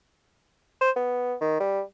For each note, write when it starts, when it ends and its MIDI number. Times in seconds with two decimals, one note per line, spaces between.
0.81 0.91 72
0.96 1.34 59
1.41 1.57 51
1.60 1.82 55